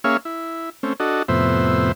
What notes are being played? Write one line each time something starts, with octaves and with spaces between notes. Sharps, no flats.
A#3 C#4 G#4 C#5 E5 F5
E4
A3 C4 C#4
D4 F#4 A4 D#5
F2 A2 C3 B3 C5 E5